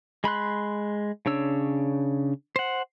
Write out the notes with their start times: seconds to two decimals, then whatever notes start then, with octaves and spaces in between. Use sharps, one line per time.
0.24 G#3 B5 C6 F#6
1.26 C#3 D4 C#5 E6
2.56 C5 F#5